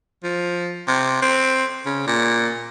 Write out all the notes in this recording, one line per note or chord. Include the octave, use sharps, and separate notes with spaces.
F3
C3
C4
C#3
A#2